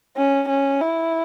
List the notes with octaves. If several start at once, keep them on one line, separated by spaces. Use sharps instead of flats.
C#4
C#4
E4